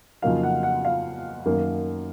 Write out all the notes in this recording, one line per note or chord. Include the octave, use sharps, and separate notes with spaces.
F2 C#3 F#3 A#3 D#4 F5
F#5
F#5
F5
F#2 D#3 A#3 C#4